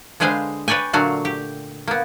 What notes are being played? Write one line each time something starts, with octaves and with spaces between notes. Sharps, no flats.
D3 G#3 G#4 B4 C5 F5
B4 C#5 D5 G5 G#5
A#2 D3 F#3 A3 F#4 F5
G4
A#3 B3